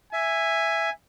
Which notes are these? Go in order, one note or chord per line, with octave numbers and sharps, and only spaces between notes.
E5 G#5